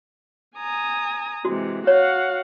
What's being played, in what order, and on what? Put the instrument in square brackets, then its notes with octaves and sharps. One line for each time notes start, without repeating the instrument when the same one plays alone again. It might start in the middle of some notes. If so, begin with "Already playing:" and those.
[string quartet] G#5 A#5 D#6
[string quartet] C3 E3 G#3 [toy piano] F#4
[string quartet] F#4 F5 F#5 [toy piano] C#5